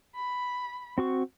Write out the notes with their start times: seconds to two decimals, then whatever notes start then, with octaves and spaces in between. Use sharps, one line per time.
0.16 B5
0.98 C4 F#4 C#6